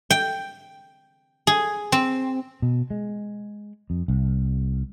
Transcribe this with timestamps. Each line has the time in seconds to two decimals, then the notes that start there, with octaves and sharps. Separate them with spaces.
0.10 G5
1.47 G#4
1.92 C4
2.62 B2
2.90 G#3
3.90 F2
4.08 C2